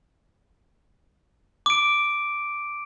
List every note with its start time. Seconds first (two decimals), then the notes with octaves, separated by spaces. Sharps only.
1.66 D6 D7